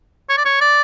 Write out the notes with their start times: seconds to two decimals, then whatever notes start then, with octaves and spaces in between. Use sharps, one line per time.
0.29 C#5
0.37 D5
0.45 C#5
0.61 D5